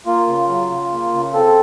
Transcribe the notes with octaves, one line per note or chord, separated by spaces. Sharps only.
A#3 F4
C#3
F#3
C#3
A#3
C#3
C4 A4